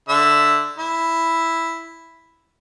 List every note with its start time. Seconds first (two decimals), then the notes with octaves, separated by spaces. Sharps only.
0.09 D3 E5 E6
0.78 E4